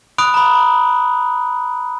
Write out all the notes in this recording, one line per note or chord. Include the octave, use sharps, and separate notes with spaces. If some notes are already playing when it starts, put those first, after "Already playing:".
B5 D#6 F#6 D7
A#5 B5